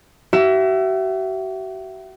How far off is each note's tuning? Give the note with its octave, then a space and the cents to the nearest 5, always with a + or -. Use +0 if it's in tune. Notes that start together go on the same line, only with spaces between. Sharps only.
F#4 +45 E5 +20